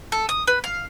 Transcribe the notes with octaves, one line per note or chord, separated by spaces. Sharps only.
A4
D#6
B4
F5